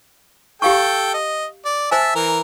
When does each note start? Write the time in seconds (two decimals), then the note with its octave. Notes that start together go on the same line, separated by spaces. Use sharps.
0.62 G4 A4 F5 G5 C#6
1.14 D#5
1.65 D5
1.91 C5 E5 G#5 A5
2.15 E3 A#4